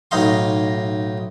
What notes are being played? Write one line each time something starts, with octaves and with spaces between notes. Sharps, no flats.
B1 A2 D#4 D#5 F5 C6